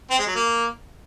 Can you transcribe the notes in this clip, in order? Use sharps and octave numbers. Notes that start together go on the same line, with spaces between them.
C4
G#3
F#3
A#3